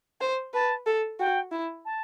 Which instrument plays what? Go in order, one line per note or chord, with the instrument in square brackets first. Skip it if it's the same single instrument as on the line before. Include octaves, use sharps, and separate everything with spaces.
[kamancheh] C5
[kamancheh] B4 [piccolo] A5
[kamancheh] A4
[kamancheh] F#4 [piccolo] G5
[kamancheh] E4
[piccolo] A5